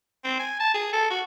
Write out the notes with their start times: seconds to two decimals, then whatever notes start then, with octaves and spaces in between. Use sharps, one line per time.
0.24 C4
0.39 G#5
0.60 A5
0.74 G#4
0.93 A4
1.10 F#4